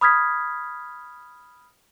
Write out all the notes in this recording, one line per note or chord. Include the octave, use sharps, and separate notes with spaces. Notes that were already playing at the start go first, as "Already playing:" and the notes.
B5 D#6 F6 G#6 B6